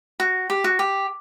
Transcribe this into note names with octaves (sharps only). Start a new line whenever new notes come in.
F#4
G4
F#4
G4